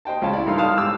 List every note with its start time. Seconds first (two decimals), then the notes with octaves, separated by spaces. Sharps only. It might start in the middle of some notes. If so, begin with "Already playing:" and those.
0.05 C5 D#5 G5 A5
0.22 C#2 C#4 F4 A5
0.33 E4 D5
0.46 G2 D#4 E4 A4 F5 C6
0.58 F5 A5 D#6 F6
0.75 G#2 G4 D6 E6